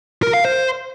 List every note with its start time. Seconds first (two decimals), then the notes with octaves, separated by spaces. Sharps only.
0.23 A#4
0.34 F5
0.45 C5